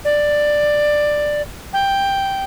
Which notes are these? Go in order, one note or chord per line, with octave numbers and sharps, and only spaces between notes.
D5
G5